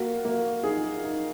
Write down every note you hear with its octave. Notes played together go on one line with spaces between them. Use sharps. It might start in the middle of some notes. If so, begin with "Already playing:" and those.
Already playing: A#3 F#4
A#3
D#4 G#4
D#4